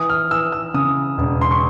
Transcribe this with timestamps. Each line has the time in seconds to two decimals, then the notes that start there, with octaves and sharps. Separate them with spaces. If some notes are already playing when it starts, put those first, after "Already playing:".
Already playing: E3 D#6
0.10 F6
0.31 E3 E6
0.52 E6
0.74 C#3 D#6
1.18 E1
1.41 C6
1.51 C#6